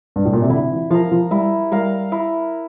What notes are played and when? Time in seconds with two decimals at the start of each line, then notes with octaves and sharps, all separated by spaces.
0.16 G2
0.25 A2
0.33 A#2
0.42 C3
0.49 D3 E4
0.70 E3
0.90 F3 A#4 F5
1.12 F3
1.31 G3 E4
1.72 G3 A#4 F5
2.12 E4